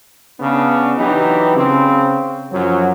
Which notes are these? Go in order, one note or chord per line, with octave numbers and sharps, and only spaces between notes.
C#3 B3 D4
E3 F#3 D#4 G4 B4
C#3 C4
F#2 F3 F#3